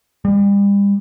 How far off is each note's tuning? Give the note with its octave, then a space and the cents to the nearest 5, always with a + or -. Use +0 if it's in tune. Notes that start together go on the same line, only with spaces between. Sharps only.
G3 +40